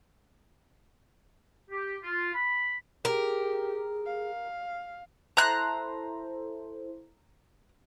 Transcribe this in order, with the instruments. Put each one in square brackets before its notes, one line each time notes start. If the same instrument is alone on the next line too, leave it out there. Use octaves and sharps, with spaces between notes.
[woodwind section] G4
F4
B5
[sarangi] G4 [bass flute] G#4 [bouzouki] A#4
[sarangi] F5
[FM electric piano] E4 A4 C5 [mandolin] A#5 F#6